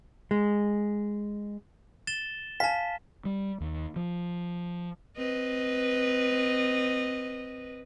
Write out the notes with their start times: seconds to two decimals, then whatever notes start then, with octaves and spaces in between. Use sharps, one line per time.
0.31 G#3
2.07 A6 E7 G7
2.60 F5 G#5 A5 B6
3.25 G3
3.61 D#2
3.96 F3
5.17 C4 B4 D#5